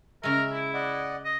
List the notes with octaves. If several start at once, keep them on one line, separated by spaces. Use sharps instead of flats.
C#3 G#3 A#4 E5
E4
D5 D#5 F#5
D#5